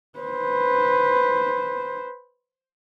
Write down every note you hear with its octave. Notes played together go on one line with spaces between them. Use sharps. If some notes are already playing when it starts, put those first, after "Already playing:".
B4 C5